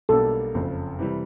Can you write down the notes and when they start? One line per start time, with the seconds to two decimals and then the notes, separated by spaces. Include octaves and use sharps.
0.09 B1 B2 G3 A#3 D4 A4
0.54 F#1 F2 C#3
0.99 C3 E3 G3